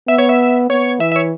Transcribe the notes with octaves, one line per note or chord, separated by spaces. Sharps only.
B3 E5
C#5
E5
B3 C#5
E3 E5
E5
C#5